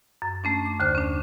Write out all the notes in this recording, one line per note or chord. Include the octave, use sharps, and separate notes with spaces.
F#2
A3 C#4 D4
D6
D#2 D3 C5 F6
C#4 D4